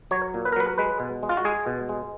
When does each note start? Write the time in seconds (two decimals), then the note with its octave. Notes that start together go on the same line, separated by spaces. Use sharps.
0.11 F#3 C#5
0.34 A#2
0.45 B4
0.52 A#4
0.56 F#3 B4
0.78 G#3 B4
1.00 B2
1.23 G#3
1.29 F4
1.37 F#4
1.45 G#3 G#4
1.67 B2
1.89 G#3